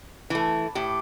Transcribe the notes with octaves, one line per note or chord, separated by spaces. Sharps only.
E3 A3
A2 G4